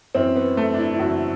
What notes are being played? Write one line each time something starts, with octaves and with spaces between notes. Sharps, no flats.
F#2 E3 C4
B3
A3
D4
E4
E4
F#2 E3 F#4